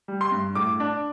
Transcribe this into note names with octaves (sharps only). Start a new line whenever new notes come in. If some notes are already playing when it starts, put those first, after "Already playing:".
G3
C6
G2
A2 D6
D4